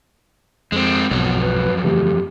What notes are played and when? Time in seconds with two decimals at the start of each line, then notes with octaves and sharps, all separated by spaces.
0.72 F2 G#3 C4
1.11 B1 F2 G#2 B2 F#3 B3
1.41 B4
1.84 C#3 E3 A3 G4